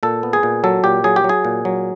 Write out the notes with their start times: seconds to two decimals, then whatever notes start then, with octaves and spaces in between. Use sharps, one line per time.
0.03 A#2 A4
0.23 B3
0.33 G#4
0.43 A#2
0.64 F#3 A4
0.84 A#2 G4
1.04 F#3 G#4
1.16 G4
1.24 F#3
1.29 G#4
1.45 A#2
1.65 F#3